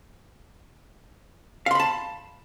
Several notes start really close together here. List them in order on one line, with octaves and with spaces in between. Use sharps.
F5 C6 B5 A5